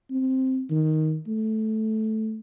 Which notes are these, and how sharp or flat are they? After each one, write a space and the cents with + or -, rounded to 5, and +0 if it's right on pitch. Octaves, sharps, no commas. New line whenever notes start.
C4 +0
D#3 +5
A3 -10